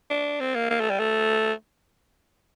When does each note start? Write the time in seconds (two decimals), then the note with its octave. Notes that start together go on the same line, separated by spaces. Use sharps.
0.10 D4
0.40 C4
0.55 A#3
0.70 A#3
0.80 A3
0.90 G3
0.99 A3